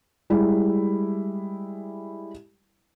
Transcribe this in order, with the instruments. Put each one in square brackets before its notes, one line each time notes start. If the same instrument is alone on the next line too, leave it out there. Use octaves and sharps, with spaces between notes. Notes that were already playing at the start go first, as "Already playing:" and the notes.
[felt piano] G3 G#3 E4